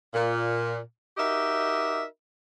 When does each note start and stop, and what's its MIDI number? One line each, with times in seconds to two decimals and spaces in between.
0.14 0.77 46
1.18 2.03 63
1.18 2.03 66
1.18 2.03 67
1.18 2.03 70
1.18 2.03 75
1.18 2.03 76